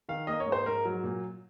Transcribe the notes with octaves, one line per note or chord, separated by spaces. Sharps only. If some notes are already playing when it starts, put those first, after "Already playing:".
D#3 F5
A#3 D#5
C#5
G#2
C5
G#2 A#4
F#3
A#2